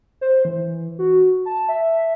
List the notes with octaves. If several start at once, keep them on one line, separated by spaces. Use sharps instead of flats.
C5
E3
F#4
A5
E5